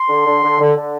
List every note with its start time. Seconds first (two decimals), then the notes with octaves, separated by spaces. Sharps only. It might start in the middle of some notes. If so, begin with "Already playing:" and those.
Already playing: C6
0.09 D3
0.26 D3
0.43 D3
0.59 D3
0.76 D3